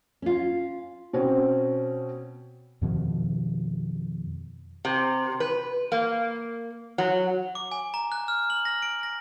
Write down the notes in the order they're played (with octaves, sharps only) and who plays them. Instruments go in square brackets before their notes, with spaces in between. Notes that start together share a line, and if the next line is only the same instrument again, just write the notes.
[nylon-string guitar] C#4 F4
[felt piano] B2 C4 C#4
[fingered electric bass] F2 B2 D#3 F3
[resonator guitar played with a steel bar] C3
B4
A#3
F#3
[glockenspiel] D6
G#5
A#5
F#6
F6
F#7
A#6
D7
A#6